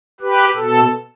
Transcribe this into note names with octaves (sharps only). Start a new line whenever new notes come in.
G4 B4
B2 A4